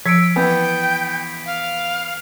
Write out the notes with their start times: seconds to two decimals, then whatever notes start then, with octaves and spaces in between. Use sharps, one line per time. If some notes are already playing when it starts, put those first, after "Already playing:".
0.06 F3 E6 G#6 B6 C#7 D7
0.36 E3 B3 G5
1.46 F5